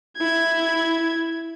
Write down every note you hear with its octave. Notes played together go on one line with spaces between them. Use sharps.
E4 G#6